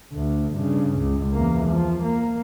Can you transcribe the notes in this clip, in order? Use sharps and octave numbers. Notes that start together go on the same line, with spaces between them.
D2
G2 C#3
C#2
E2 A#3
F3
A#3